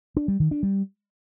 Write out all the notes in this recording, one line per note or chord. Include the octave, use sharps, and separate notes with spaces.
D4
G3
D#3
D4
G3